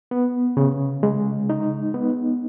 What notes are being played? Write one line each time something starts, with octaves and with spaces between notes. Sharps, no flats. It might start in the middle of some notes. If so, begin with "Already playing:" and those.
B3
C#3
G#3
D#4
B3